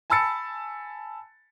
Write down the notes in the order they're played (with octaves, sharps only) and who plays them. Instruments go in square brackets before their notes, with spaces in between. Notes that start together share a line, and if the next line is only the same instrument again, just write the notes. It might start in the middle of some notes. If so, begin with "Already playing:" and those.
[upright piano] G#5 A5 B5 E6 A6 C#7